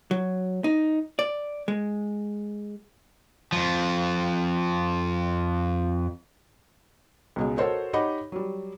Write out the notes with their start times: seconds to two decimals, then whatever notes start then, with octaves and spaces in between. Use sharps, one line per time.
0.11 F#3
0.64 D#4
1.19 D5
1.68 G#3
3.52 F2 F3
7.36 C#2 B2 G#3
7.57 F#4 A4 A#4 C5 C#5 D#5
7.93 D#4 G4 C#5 D#5 F#5 B5
8.32 F#3 G3